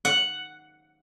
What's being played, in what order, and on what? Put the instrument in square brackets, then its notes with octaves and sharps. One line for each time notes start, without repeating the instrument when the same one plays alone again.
[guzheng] F#5